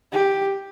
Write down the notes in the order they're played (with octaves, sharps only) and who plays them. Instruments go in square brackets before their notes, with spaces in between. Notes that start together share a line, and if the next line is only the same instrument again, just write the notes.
[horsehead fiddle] G4